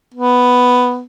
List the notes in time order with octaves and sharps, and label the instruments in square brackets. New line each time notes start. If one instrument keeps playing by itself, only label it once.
[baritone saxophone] B3